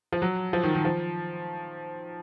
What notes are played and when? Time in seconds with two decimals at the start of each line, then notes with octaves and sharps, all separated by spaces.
0.12 F3
0.22 F#3
0.53 F3
0.64 D#3
0.75 D#3
0.85 F3